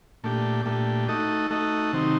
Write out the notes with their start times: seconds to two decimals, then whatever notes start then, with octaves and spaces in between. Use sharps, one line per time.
0.24 A#2 A3 D4 G4
0.65 A#2 A3 D4 G4
1.08 A3 D#4 F#4 A4 D#5
1.50 A3 D#4 F#4 A4 D#5
1.93 C3 D#3 F#3 C4 D#4